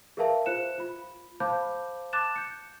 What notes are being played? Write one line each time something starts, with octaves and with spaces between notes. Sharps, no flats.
G#4 A#4 B4 E5 F5 A5
F4 C5 F#6 C#7 E7
F4 B5
C5 F5 A5 B5 D6 G6
A5 D6 F#6 A6 E7
G6 C#7